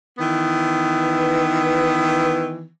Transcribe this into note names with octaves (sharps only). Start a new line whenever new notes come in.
D#3 E3 B3